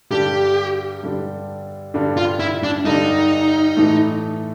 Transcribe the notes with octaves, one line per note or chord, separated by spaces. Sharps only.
G2 D3 G3 G4
G2 D3 G3
G2 D3 G3
F4
E4
D4
G2 D3 G3 D#4
A2 E3 A3